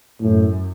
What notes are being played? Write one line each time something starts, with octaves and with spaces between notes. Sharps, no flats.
F#2 A2